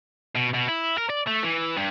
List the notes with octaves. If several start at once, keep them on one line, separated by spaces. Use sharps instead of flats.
B2
B2
E4
A#4
D5
A3
E3
G2